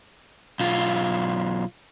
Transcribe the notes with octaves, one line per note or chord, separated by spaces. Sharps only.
B1 F4